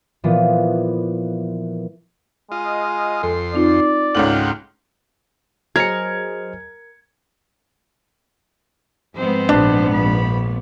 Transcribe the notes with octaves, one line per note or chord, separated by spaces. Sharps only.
A#2 E3 F3 B3
G#3 F4 D#5
F2 A4 C6
C4 D#4 F4 D5
C#2 G#2 F4 A4 C#5 F#5 G5 F#7
F#3 G#4 A#4 C5 D#5 F6 G#6 C#7
F2 G#2 B3 C4 C5
A#1 D4
A#1 B5